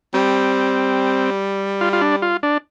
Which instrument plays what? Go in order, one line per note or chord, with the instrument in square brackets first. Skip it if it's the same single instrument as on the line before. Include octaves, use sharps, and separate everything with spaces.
[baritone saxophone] G3 [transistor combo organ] C4
[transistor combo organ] F4
F4
D4
F4
D4